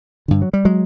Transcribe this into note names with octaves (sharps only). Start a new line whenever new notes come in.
G2 D3
F#3
G3
F#3 G#3